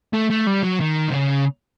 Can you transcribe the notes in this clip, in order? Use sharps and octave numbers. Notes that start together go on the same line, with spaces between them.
A3
A3
G3
F#3
D#3
C3
C#3